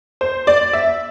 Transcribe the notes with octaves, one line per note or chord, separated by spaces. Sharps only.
C5
D5
E5